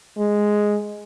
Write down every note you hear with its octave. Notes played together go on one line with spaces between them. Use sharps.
G#3